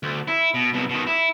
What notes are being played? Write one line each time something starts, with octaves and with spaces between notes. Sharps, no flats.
D2
E4
B2
C2 B2
B2 D#3
E4